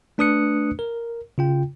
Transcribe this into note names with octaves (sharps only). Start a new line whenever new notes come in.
A3 D4 B4 D#6 F#6 C#7
A#4
C#3 F4 G5